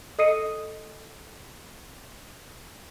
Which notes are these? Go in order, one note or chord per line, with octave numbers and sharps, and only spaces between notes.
A4 D#5 D#6 C7 C#7 D#7